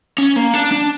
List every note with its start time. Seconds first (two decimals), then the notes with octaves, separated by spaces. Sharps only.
0.18 C#4
0.36 A#3
0.54 D4
0.72 D4